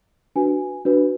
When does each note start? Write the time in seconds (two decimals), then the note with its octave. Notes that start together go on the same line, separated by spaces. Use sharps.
0.36 D4 F#4 B4 G#5
0.85 D4 F#4 B4